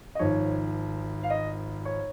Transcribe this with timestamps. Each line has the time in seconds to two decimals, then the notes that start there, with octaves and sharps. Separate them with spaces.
0.15 D#5
0.19 G#1 G#2 F3 C#5
1.23 F5
1.30 D#5
1.85 C#5